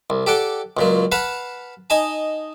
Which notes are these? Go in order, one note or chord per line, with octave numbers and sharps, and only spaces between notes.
C2
G4 A4 D5 F#5 G5
C#2 A#2 F#3
B4 F5 F#5 A5 B5
D#4 D#5 G#5 A5